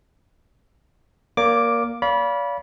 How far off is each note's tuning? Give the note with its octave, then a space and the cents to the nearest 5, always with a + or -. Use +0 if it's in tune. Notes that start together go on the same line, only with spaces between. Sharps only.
A#3 +5 D5 -40 D6 +0
D5 -40 F5 +0 B5 -20